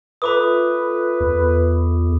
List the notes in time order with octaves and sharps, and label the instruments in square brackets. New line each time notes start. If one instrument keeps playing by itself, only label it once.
[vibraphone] F4 A4 E5 [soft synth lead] B4 [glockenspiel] B5 D6 D#6
[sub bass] E2